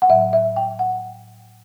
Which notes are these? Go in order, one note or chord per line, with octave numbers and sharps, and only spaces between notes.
F#5
A2 F#3 E5
E5
G5
F#5